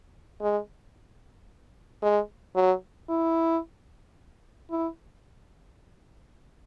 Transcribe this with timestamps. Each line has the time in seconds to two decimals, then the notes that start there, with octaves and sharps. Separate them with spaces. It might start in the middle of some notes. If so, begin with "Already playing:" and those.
0.42 G#3
2.03 G#3
2.56 F#3
3.09 E4
4.70 E4